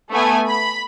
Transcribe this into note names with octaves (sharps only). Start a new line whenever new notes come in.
A3 B3 G#5
B5